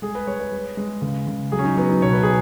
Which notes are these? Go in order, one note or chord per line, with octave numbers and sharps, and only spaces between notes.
G#3 G#4
B4
G#3 C#5
B4
G#3
G#3
C#3
C#3
F#3 G#4
C#4
D#4
F#3 B3
D#4
B2 C#5
B4
G#4